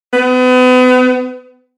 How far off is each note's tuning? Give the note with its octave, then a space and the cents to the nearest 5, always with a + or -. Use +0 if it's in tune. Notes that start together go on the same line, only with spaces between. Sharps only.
B3 +35